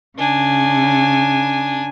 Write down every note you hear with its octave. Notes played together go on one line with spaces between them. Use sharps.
C#3 D4 G#5